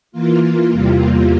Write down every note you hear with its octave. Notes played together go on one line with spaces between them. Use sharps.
E3 A#3 F4
E2 C3 G3 A#3 F4